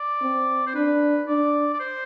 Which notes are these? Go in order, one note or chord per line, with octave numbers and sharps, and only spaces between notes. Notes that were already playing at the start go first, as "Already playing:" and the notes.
Already playing: D5
C4
C5
D4 B4
D4 D5
D5
C5